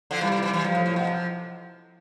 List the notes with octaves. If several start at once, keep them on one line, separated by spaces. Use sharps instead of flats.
D3 F3
C3 E3 G3
C3 E3
C3 E3
C3 E3
G2 F3
A2
A2
B2
C3